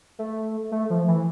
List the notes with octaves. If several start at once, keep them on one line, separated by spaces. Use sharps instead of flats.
A3
A3
F3
E3